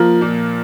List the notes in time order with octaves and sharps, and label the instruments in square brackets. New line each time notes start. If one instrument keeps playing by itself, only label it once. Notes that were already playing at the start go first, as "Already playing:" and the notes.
Already playing: [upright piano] F3 A#3
A#2